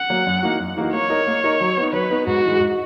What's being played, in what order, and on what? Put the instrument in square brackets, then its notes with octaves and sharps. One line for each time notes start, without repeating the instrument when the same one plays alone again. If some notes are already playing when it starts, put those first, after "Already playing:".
Already playing: [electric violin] F#5
[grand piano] F#3 A#3
F#2
E3 A#3 D#4 F#4
F#2
E3 A#3 D#4 F#4
[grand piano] A#3 [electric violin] C#5
[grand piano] D#4 A#4 D#5
A#3
D#4 A#4 D#5
F#3
B3 D#4
[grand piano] F#3 [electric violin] B4
[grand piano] B3 D#4
[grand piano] G#2 [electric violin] F#4
[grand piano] E3 G#3
G#2